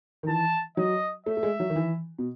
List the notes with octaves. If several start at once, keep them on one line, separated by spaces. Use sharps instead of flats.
D#3
E3 A5
F#3 D#5
A3 E5
A3
G#3
F#3
D#3
E3
B2